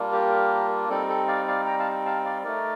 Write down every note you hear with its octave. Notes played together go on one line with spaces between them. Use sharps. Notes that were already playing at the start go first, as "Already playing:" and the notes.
Already playing: G3 A#3 D4 F4
G4 A#4
G3 C4 D#4 A4
A4
D5 F5
D5 F5
G5 A#5
F5 A5
F5 A5
D5 F5
A3 D#4 A#4 D5